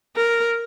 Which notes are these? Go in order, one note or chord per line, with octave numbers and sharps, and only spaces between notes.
A#4